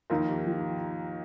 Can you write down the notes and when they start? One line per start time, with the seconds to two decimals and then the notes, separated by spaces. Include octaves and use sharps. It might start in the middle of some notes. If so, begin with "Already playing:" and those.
0.10 D#2 D#3 F3
0.28 G4
0.46 F3